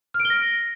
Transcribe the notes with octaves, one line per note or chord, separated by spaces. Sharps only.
F6
D7
G7
A#6